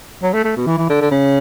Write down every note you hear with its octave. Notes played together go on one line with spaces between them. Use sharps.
F#3
A3
A3
B2
E3
E3
D3
D3
C#3